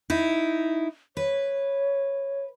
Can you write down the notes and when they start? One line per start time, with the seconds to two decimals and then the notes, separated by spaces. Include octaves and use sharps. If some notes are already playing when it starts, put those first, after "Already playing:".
0.10 D#4 E4
1.17 B4 C#5